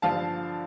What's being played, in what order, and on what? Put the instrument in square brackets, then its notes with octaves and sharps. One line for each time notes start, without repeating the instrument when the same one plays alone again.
[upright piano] G2 D3 F3 F5 A5